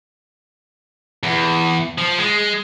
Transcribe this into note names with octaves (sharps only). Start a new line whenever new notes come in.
E2
F3
G#3